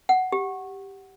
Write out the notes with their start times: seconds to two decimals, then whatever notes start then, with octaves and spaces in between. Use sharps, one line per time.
0.09 F#5
0.32 G4